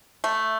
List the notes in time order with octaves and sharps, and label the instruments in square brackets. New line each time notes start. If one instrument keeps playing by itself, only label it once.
[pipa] A3